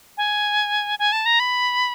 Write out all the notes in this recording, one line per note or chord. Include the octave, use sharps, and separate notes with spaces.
G#5
G#5
A5
A#5
B5